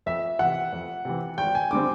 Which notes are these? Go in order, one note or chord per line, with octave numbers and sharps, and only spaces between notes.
F2 E5
C3 E3 F#5
F2
C3 E3
G#1 G5
G#5
D3 G3 C4 D6